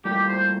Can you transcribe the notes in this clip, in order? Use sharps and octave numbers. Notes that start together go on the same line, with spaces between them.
A2 G3 A#3 F4 G4
C5